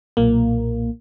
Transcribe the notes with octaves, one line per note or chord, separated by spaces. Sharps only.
B1 A#2 A#3